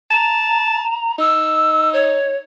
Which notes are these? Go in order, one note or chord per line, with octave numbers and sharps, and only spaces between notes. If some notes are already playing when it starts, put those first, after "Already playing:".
A5 A#5
D#4 E6
C#5